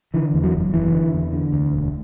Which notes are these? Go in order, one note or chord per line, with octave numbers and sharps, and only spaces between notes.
D3 E3
E2
F#3
F#1
F#1 E3
D3
E2
D3
D2
E1